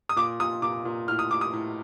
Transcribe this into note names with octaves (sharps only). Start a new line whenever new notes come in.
D#6
A#2 D6
A#2 D#6
A#2 D6
A#2
A2 F6
D#6
A2 D6
D#6
A2